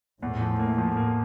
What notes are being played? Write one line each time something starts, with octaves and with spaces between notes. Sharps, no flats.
E2 A2
F3
A#3
F3
A#3